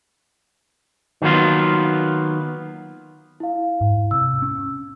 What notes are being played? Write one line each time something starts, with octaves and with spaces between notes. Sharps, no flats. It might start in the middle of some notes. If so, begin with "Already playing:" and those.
D#3 F#3 A#3 B3 F4
E4 F5
G#2
C3 E6
C#4